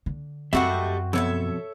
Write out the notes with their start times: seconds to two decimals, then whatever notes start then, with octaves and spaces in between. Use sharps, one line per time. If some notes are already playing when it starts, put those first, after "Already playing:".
0.06 D3
0.53 F#2 G3 A3 C4 F#4 D#5 E5 F#5
1.13 F2 B2 A4 C#5 E5